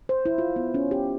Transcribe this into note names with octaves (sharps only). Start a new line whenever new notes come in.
C5
E4
F4
B3
C#4
G4